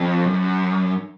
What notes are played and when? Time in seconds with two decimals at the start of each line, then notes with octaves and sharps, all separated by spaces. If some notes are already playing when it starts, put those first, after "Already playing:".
Already playing: F2
0.26 F#2